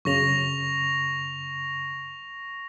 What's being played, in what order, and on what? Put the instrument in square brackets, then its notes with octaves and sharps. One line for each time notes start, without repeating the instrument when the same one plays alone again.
[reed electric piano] F#2 C#3 [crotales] C#6 A#6 F7